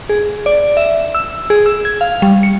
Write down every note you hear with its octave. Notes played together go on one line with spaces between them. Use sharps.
G#4
D5
E5
E6
G#4
E6
G#6
F5
G3
C#7